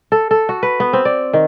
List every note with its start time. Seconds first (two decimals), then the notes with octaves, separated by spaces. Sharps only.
0.12 A4
0.31 A4
0.49 F#4
0.63 B4
0.80 B3
0.93 C4
1.05 D5
1.33 D#3